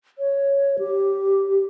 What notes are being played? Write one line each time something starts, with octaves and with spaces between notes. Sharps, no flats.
C#5
G4